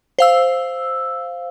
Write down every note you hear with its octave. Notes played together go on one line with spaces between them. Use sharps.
C5 F5 E6